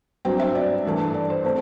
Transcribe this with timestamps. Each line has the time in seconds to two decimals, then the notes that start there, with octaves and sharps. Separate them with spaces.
0.25 G2 F#3 C4 G5
0.40 E5
0.55 D5
0.85 G2 E3 A3
1.14 D5
1.30 C5
1.44 A3 C4